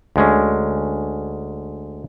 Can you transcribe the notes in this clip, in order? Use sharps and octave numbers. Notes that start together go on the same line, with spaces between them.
D2 G#3 C#4